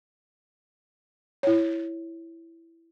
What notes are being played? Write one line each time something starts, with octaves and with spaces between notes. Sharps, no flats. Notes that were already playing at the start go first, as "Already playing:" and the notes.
E4 C#5